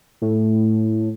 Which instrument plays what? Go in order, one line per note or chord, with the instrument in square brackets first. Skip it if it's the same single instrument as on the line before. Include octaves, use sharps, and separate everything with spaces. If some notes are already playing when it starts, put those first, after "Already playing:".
[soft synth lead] A2